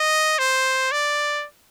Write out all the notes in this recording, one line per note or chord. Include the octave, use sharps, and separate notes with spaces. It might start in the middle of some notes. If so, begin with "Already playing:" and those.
Already playing: D#5
C5
D5